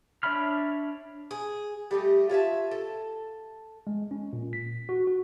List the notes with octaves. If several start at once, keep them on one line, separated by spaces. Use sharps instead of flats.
D4 C#5 E5 B5 F6
G#4
G3 A3 G4 D#5
F4 C#5 E5 A5
A4
G#3
C#4
A#2
B6
F#4
F#4